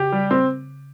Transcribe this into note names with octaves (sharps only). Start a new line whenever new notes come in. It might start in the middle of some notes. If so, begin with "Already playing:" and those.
Already playing: C#3 G4
G3
C4